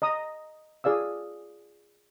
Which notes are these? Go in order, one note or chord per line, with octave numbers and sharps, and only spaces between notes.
D#5 A#5 D#6
F4 G#4 D5 F5 E6